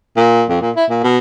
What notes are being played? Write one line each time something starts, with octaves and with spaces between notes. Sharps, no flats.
A#2
F2
A#2
E4
A#2
B2